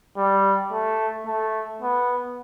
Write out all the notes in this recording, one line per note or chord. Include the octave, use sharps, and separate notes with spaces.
G3
A3
A3
B3